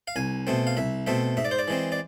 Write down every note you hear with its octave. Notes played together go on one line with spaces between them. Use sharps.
F5
C2 G#5
B2 A3 C4
F5
C2 E5
B2 A3 C4 E5
G#2 E5
D5
C5
D5
E3 G#3 C4
D5